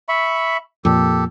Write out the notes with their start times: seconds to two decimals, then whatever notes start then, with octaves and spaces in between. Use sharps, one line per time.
0.09 E5 B5 C#6
0.85 F2 A#2 G4 A4